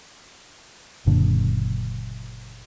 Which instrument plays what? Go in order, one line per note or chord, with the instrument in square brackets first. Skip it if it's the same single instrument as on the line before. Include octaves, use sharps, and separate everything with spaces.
[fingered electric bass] F#1 F#2 A#2 D3